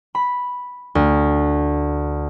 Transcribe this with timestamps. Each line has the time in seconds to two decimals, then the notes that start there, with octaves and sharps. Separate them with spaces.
0.15 B5
0.95 D2